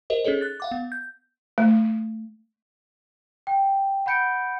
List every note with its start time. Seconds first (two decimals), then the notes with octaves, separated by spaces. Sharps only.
0.10 G4 A#4 C5 D#5
0.24 C#4 D#4 G#4 A4 C#5
0.41 F#6 A6
0.60 F5 F#5 D6
0.71 B3
0.92 G6
1.58 A3
3.47 G5
4.06 F#5 B5 G6 C#7 D7